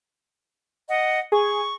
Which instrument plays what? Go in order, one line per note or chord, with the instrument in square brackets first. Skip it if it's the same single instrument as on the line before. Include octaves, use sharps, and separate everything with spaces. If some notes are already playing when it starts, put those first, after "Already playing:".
[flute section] D#5 F#5
[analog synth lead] G#4 [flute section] C#6